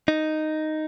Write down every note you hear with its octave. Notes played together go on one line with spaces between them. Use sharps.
D#4